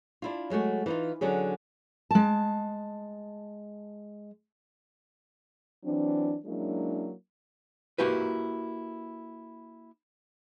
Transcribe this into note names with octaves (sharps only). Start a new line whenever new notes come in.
D4 E4 F4
F#3 G#3 A3 F#4
E3 D#4 F4
D3 F#3 C#4 G#4
G#3 A5
E3 F#3 C4 D4
F#3 G#3 A#3 C#4 D4 E4
A#3 E4 F#4 G4 B4